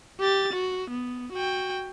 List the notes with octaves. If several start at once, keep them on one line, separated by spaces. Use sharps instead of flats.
G4 A6
F#4
B3
F#4 G5